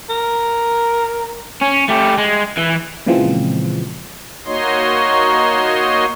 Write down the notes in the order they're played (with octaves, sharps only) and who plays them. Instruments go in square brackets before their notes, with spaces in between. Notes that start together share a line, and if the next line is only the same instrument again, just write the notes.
[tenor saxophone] A#4
[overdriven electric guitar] C#4
A3 G4
G#3
E3
[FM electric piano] A#2 C#3 E3 F3 G#3 C4
[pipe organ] A#3 D#4 F#4 C#5 D#5 C6